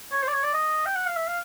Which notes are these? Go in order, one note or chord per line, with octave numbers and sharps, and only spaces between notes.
C#5
C5
D5
C#5
D5
D#5
G5
F#5
F5
E5
F5